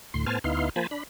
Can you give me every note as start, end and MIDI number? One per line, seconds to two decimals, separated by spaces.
0.14 0.25 38
0.14 0.25 45
0.14 0.25 84
0.26 0.39 45
0.26 0.39 59
0.26 0.39 72
0.26 0.39 80
0.26 0.39 81
0.26 0.39 89
0.44 0.69 38
0.44 0.69 59
0.44 0.69 63
0.44 0.69 64
0.44 0.69 77
0.44 0.69 84
0.76 0.87 53
0.76 0.87 58
0.76 0.87 72
0.76 0.87 80
0.76 0.87 81
0.76 0.87 83
0.91 1.03 62
0.91 1.03 83